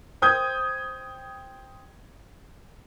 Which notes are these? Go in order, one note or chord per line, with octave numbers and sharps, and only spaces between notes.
C5 G5 D#6 G6 G#6